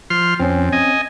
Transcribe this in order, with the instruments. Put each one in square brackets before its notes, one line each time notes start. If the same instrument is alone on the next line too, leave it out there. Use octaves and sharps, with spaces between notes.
[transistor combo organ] F3 C6 F6
[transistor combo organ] F2 [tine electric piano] C4 C#4
[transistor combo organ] D#5 G#5